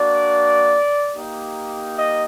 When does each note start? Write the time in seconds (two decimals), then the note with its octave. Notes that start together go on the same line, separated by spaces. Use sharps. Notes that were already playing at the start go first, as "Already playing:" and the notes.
Already playing: A#3 D4 F#4 D5
1.14 A#3 D#4 G4
1.97 D#5